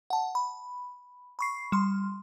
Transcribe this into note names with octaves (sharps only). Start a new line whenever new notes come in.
F#5 A5
B5
B5 C#6 C7
G3 C6